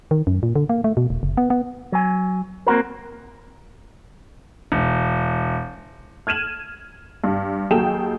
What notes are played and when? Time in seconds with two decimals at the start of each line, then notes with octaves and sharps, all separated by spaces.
0.11 D#3
0.27 F#2
0.43 A#2
0.56 D3
0.69 A#3
0.84 A3
0.97 B2
1.10 E1
1.23 F#1
1.37 B3
1.50 B3
1.92 F#3 G#5
2.67 A#3 C4 F#4 A#4
4.72 E1
6.27 F6 G#6 D#7 E7 F#7
7.24 G2
7.71 D#2 F#3 G#4 A4 G5 E7